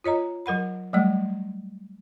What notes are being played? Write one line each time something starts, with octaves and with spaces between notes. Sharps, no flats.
F4 C#5 D#5 A#5
F#3 A#4 F#5 B5
F#3 G3 A3 D5